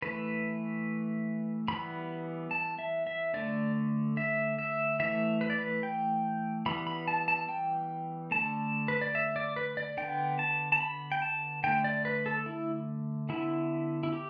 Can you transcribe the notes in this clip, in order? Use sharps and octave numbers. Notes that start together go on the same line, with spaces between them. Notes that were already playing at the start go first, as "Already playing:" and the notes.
E3 A3 B4
E3 G3 B3 B5
A5
E5
E5
D3 A3 D5
E5
E5
E3 A3 E5
B4
D5
B4
G5
E3 G3 B3 B5
B5
A5
A5
G5
D3 A3 A5
B4
D5
E5
D5
B4
D5
D3 B3 G5
A5
A5
B5
G5
A5
D3 A3 G5
D5
B4
A4
E4
D3 B3 E4
E4
G4